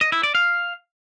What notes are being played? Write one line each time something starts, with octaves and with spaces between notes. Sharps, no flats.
D#5
E4
D5
F5